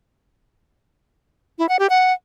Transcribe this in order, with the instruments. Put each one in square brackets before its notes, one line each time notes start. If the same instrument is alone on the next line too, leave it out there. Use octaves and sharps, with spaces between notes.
[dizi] E4
F#5
G4
F#5